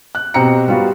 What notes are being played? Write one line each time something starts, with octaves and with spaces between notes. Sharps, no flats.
F#6
B2 C4 G4 A#5 C#7
G3 B3 F4 F#4